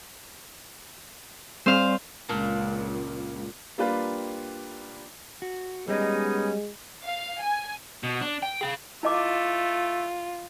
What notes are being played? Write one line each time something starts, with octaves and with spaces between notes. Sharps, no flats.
G3 C4 C5 D5 F5
C#2 A#2 D4 A#5
G3 A#3 D4 F4 G4 B4
F#4
G3 G#3 B3 C#4 D#4 G4 D#5
F5
G#5
B2
D4
G5
G#4 F5
A3 E4 F4 D#5 D6